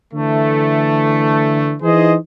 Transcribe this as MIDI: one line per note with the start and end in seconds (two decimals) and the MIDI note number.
0.13 1.75 50
0.13 1.75 52
0.13 1.75 57
1.82 2.15 52
1.82 2.15 63
1.82 2.15 68
1.82 2.15 72
1.82 2.15 75